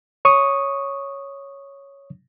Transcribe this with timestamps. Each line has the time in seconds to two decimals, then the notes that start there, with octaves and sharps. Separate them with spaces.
0.25 C#5 C#6 D#6